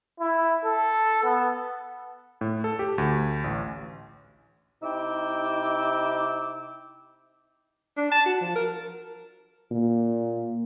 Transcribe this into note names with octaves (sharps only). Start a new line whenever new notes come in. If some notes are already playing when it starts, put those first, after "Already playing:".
E4
A4
B3
A2
A4
G4
D2
A1
C3 D#4 E4 G5 D6 E6
D4
A5
F#4
F3
A#4
A#2